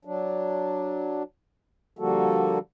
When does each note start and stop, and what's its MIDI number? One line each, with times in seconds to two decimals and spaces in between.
0.05 1.23 54
0.05 1.23 62
1.99 2.59 50
1.99 2.59 53
1.99 2.59 55
1.99 2.59 58
1.99 2.59 66
1.99 2.59 69